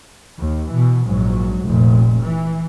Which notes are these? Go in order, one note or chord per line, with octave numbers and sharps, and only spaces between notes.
D#2
B2 E3
A#1 G#2 F#3
F1 A#1 A#2
E3